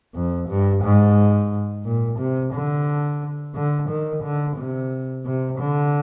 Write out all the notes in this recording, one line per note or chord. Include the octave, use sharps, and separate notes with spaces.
F2
G2
G#2
A#2
C3
D3
D3
D#3
D3
C3
C3
D3